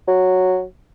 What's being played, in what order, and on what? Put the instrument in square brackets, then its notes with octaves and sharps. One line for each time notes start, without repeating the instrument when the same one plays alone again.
[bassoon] F#3